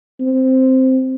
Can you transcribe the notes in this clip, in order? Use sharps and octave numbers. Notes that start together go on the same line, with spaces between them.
C4